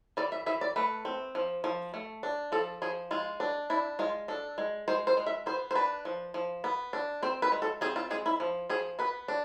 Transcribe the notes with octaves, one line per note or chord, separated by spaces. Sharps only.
E3 D5
E5
E3 E5
D5
A3 B4
C4
F3
F3
A3
D4
F3 A4
F3 G#4
G#3 F4
D4
D4 E4
G#3 F4
D4 A4
G#3
G#3 C5
C5
G#3
E5
B3 C5
C5
D4 B4
F3
F3
B3
D4
C4 C5
B4
G#3
A4
C4 G#4
F4
G#3 G#4
E4
F3
F3 G#4
B3 B4
D4